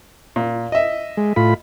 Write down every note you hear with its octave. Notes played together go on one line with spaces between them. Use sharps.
A#2
D#5 E5
G#3
A2 F4 B5